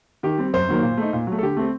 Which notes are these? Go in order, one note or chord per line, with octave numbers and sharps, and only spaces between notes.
D#3 G4
G3 C4
F#2 C5
D#3 F#3 A#3
A#2
A3 D#4
A#2
F#3 A3
A4
D3 G4
A3 C4